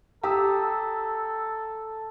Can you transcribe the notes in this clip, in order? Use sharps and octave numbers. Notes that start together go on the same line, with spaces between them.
G4 A4 A#5 D#6 E6